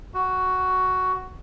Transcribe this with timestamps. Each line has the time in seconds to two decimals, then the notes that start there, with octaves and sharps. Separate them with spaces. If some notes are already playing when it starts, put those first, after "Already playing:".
0.14 F#4